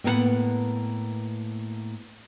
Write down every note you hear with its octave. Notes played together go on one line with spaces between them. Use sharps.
A2 A#3 B3 A#4 B4 F#5